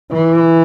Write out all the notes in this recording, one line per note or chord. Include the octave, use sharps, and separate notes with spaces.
E3